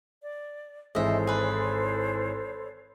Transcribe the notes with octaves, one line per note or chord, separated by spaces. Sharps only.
D5
G#1 E3 G#3 A4 C5 C#5 D#5 E5
G#4 B4